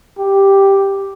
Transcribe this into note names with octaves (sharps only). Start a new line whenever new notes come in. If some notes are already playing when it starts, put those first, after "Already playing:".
G4